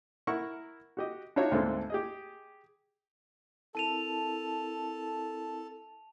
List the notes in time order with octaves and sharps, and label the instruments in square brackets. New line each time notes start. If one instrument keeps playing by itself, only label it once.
[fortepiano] E4 A#4 F#5 C#6
F#4 G4 D#5
D4 D#4 F4 F#4 C#5 E5
D2 G#2 A#3 C4 D4 A4
G4 G#4 D#5
[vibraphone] C4 E4 A#4 [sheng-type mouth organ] A4 [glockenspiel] A5 D#7 F7